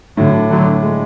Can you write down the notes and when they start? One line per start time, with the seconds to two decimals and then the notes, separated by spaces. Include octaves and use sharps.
0.16 A2 D3 F#3
0.33 D4
0.50 D3 F#3 D4
0.66 D4
0.83 G#3